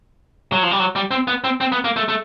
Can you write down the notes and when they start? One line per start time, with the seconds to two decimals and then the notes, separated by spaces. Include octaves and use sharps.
0.53 F#3
0.63 F3
0.71 G3
0.80 F#3
0.96 G3
1.11 C4
1.28 B3
1.44 C4
1.61 C4
1.72 B3
1.84 A#3
1.96 A3
2.08 A3